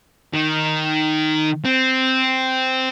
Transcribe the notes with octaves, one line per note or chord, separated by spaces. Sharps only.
D#3
C4